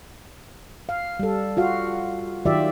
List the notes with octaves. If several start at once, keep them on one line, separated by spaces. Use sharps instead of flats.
F5
G3 A4
F4 F#4 F5
D#3 F#3 F4 G4 D5 E5